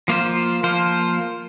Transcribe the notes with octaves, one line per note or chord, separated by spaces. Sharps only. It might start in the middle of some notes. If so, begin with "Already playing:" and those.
F3 A#3 F4 C5
F3 A#3 F4 C5